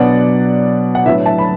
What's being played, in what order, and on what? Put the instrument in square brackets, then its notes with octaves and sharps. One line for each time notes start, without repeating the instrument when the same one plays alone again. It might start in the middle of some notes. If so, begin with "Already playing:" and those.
Already playing: [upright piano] B2 F#3 B3 D4 D5 F#5
F#5
A2 F#3 B3 D4 B4 E5
E5 A5
B5